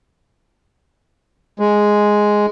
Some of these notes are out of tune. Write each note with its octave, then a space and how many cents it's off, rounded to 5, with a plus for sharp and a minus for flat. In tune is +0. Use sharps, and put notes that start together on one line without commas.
G#3 +0